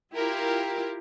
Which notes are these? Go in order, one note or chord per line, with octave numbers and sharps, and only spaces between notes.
E4 F4 G4 A#4